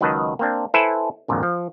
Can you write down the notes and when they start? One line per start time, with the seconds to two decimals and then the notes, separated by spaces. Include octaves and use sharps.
0.01 C#2 D#3 F#3 B4 D#5 A5
0.39 A#3 C4 D4
0.74 E4 A4 B4 C5 E5 G#5
1.28 G#1 F2 A#2 D3
1.43 F3